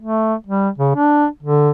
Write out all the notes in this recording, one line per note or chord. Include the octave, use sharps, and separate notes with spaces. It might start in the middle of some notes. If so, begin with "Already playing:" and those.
A3
G3
C#3
D4
D3